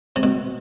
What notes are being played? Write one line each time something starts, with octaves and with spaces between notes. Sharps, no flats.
C3
B2